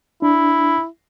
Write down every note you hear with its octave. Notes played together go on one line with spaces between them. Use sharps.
D4 E4